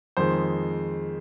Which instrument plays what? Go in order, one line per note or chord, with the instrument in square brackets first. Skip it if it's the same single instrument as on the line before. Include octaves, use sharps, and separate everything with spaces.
[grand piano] F2 D#3 G#3 C5